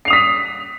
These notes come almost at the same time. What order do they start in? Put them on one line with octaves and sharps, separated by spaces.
C7 F7 D#6 B6